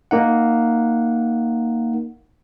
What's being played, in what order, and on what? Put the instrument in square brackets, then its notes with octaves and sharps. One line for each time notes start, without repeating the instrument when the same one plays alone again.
[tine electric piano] A#3 D#4 F#5